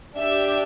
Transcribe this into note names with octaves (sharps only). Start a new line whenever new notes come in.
D4 G4 E5